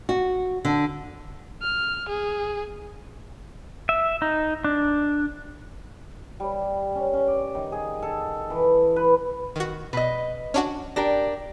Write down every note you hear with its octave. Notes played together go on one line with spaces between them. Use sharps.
F#4
D3
F6
G#4
E5
D#4
D4
G3
C#4
C#4
D5
D#3
G#4
A4
E3
B4
D#3 F#4
B2 B4 D#5
C#4 D4 F#4
D4 G4 A#4 A#6